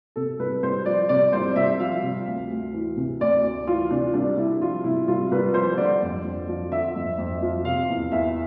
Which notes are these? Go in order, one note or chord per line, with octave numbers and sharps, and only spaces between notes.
C3 A4
C2 B4
C2 C5
F3 D5
C3 D5
C2 C5
D5
C2 E5
F3 F5
C3
D2
D2
E3
C3
D2 D5
D2
E3 F4
C3 D4
C2 D4
C2 E4
F3 F4
C3 E4
C2 F4
C2 B4
F3 C5
D3 D5
F2
F2
F3
D3 E5
F2
F2
F3
C3 F5
E2
E2 E5